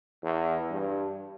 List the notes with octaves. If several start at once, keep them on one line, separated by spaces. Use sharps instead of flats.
E2
G2